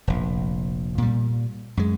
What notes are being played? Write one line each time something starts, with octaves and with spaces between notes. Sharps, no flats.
F1 A#1
A#2 G3
F#2 G#3